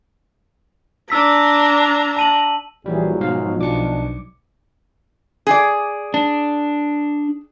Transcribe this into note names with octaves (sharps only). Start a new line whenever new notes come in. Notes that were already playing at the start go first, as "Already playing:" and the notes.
D4 A#5 E6 B6
A5 D#7 F#7
A#1 E3 F#3 G3 G#4
G#2 B2 F3 F5
B1 D4 D6 C#7
G#4 D5
D4